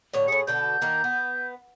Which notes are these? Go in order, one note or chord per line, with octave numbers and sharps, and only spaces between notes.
A2 D3 C#5
A2 G#4 C#7
B2 D3 A4 G6
D#3 A#3
B3